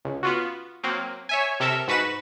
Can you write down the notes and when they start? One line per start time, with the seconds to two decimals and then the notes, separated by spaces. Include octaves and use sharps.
0.05 C#2
0.23 B3 F4 F#4
0.83 F#3 A#3 C4
1.29 C#5 E5 G#5
1.60 C3 A4 A#4 E5 E6
1.88 G#2 F#4 B4 B5 E7